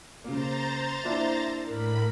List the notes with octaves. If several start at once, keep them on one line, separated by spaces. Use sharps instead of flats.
C#3 A#3 C5 A#5 A6
A#3 D4 E4 E5
A2 A#4 B5